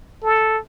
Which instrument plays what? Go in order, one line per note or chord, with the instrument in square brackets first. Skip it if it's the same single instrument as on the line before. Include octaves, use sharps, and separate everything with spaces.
[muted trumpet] A4